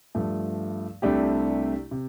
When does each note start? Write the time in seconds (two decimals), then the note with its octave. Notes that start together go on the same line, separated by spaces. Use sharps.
0.15 G2 F3 A3
1.02 C2 C3 A3 D4 G4
1.91 C3